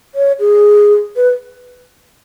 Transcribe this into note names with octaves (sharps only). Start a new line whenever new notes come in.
C#5
G#4
B4